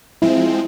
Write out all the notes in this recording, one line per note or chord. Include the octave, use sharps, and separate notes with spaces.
F3 G#3 C4 E4